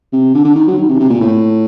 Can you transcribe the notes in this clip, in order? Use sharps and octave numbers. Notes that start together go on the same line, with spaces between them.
C3
D3
D3
D#3
F#3
D#3
C3
C3
A#2
A2